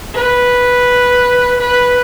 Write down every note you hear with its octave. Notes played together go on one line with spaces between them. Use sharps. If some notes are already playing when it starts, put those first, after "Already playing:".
B4
B4